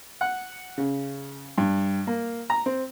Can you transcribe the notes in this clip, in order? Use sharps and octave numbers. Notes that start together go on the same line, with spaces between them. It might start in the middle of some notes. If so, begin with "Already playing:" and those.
F#5
C#3
G2
A#3
A#5
C4